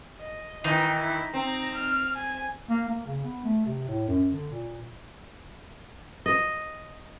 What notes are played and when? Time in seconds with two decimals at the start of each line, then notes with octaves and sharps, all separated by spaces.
0.19 D#5
0.64 D#3 E3 D#4
0.98 E4
1.33 C4 A#5
1.75 F6
2.16 G#5
2.69 A#3
2.88 A#3
3.06 C#3
3.24 B3
3.44 A3
3.66 C3
3.88 A2
4.08 F#2
4.32 D3
4.51 A#2
6.26 D#5